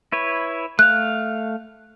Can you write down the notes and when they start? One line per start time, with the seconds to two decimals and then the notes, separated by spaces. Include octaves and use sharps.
0.12 E4 B4 C#5
0.79 A3 F5 F#6